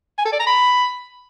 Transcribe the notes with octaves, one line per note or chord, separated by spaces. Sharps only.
G#5
A4
D5
A#5
B5